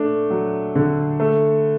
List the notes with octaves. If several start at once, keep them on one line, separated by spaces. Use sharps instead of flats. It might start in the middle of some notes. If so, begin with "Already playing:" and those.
Already playing: A3 D4
F#3
D3
A3